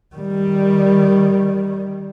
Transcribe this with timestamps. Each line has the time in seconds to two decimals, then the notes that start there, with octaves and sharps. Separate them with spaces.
0.15 D#3 G3